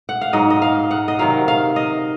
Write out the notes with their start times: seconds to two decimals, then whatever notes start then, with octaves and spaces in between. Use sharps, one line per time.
0.09 F#5
0.21 F5
0.33 G#2 F#3 D#5
0.50 D#5
0.62 F5
0.91 F#5
1.08 D#5
1.19 C3 D#3 F#3 F5
1.48 F5
1.76 D#5